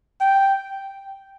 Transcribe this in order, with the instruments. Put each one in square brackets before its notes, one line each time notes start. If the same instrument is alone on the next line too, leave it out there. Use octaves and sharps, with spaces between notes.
[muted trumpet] G5